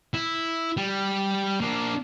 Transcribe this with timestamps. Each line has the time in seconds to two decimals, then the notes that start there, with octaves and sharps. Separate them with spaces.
0.14 E4
0.77 G3
1.61 A#3 D4